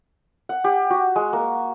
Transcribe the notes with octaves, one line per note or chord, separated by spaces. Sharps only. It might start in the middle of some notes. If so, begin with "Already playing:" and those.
F#5
G4
F#4
G#3
A#3